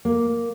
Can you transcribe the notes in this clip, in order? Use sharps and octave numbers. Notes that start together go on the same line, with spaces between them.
A#3